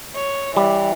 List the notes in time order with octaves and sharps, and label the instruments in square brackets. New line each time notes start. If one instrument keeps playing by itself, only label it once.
[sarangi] C#5
[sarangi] E3 [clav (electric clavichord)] G3